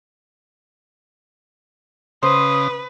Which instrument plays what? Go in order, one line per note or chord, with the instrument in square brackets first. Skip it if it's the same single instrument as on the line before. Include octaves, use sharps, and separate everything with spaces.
[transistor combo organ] C#3 [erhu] B4 [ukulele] C5 [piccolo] D#6